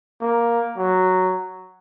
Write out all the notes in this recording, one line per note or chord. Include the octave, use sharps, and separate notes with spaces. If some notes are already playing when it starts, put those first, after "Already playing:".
A#3
F#3